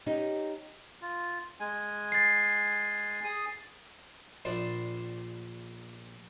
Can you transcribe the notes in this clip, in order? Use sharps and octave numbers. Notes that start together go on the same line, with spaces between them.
C#4 D#4 G4
F4
G#3 G#5
A6 C7
G#4 D#6
A#1 D5 A5 C6